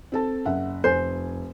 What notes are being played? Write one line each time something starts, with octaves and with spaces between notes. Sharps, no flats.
C4 A4 A5
F#1 E5 F#5
F1 C5 G#5